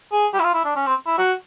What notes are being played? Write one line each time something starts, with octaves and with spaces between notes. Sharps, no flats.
G#4
G4
E4
F4
E4
D4
C#4
C4
E4
F#4